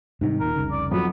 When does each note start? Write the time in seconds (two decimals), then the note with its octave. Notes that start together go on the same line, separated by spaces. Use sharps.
0.21 G#2 C3 D#3 G3
0.40 D#1 A#2 A#4
0.56 F1 C2 C#3
0.71 D5
0.91 B1 F2 F#3 B3